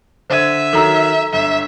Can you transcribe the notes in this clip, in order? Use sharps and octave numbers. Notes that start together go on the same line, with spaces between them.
D3 C5 E5 G#6 D#7
D#3 F#3 A4 A#5 E6
G1 E5